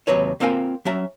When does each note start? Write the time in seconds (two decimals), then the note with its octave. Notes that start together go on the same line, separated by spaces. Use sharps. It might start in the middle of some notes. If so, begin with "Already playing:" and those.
0.07 D#2 C3 F#3 B4 C#5
0.40 A#3 C4 F4 A#4 G5 G#5
0.85 F#3 C#4 E5 A#5